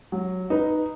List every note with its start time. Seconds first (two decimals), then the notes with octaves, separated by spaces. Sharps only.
0.12 F#3
0.50 D#4 B4